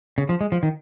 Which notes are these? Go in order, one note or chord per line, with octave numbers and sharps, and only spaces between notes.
C#3
F3
G#3
F3
D#3